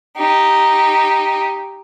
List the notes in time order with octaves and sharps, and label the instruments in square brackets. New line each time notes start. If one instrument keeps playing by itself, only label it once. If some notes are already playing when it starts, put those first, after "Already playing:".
[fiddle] D#4 G4